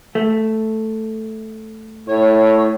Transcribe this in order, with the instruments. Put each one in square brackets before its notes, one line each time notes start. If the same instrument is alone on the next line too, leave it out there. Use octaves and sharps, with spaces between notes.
[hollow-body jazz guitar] A3
[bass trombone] A2 [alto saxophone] C#5